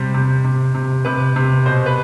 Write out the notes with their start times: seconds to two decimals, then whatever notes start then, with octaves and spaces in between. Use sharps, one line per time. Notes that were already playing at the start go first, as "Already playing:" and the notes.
Already playing: C3 G3 C5
0.14 C3
0.44 C3
0.75 C3
1.05 C3 B4
1.36 C3
1.65 B2 C5
1.86 B4